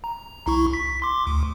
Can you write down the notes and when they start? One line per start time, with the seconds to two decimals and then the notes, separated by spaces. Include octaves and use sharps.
0.04 A#5
0.46 C2 E4 C#6
0.74 B6
1.02 C6 D6
1.27 D2